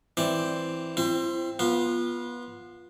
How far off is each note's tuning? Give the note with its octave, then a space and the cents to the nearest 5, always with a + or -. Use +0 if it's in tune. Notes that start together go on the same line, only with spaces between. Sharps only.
E3 +0 C4 +0 D5 +5
C4 +10 E4 +45
B3 -20 F4 +0